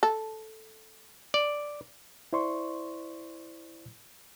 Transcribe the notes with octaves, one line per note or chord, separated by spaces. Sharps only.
A4
D5
E4 C5 D5 C6 C#6